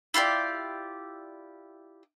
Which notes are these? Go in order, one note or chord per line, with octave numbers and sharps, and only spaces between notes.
E4 F4 G4 D5